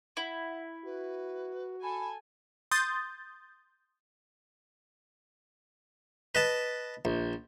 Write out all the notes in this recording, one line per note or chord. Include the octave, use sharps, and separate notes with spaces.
E4 F#5
F#4 B4
A4 G#5 B5
C6 D#6 G6 A6
B4 D#5 A5
A#1